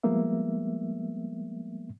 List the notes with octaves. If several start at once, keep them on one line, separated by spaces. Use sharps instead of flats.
F3 G3 G#3 A#3 B3 E5